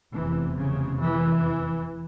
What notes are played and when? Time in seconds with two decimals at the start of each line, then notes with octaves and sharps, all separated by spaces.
0.14 F1 E2 C3 E3
0.58 C#3
1.02 E3